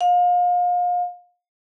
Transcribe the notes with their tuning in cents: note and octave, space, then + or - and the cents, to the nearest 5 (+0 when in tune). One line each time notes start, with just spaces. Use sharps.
F5 +35